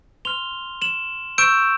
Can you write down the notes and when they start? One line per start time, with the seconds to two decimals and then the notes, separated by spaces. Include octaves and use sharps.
0.25 C6 F6 F7 G7
0.82 E7 F#7
1.38 C#6 E6 G6 D7 E7